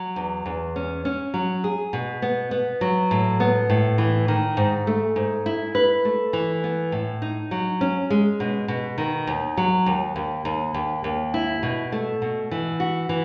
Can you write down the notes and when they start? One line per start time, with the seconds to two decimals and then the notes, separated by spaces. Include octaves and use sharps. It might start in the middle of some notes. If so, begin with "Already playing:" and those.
Already playing: F#3
0.16 E2
0.46 E2
0.76 C#4
1.05 C#4
1.34 F#3
1.64 G#4
1.93 B2
2.22 B3
2.51 B3
2.81 F#3
3.11 A2
3.40 B3
3.70 A2
3.98 E3
4.28 D#3
4.57 G#2
4.87 A3
5.16 G#2
5.46 E4
5.75 B4
6.05 A3
6.33 E3
6.64 B3
6.92 A2
7.22 D#4
7.51 F#3
7.81 C#4
8.10 G#3
8.40 B2
8.68 B2
8.98 D#3
9.27 D#2
9.57 F#3
9.86 D#2
10.16 D#2
10.45 D#2
10.74 D#2
11.04 D#2
11.34 E4
11.63 B2
11.92 A3
12.22 B2
12.51 E3
12.80 F#4
13.09 E3